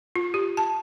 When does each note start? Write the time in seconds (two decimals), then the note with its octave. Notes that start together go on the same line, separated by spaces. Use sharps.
0.16 F4
0.34 G4
0.57 A5